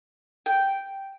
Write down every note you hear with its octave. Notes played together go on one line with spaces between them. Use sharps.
G5